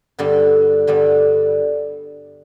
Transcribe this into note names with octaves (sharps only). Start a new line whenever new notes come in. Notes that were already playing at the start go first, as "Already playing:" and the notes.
G2 D3 G3 B3
G2 D3 G3 B3